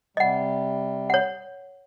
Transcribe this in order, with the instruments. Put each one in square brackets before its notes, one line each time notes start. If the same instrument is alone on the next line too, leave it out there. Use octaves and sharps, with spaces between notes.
[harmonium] C3 G3 [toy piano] D#5 F#5
[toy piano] C#5 F#5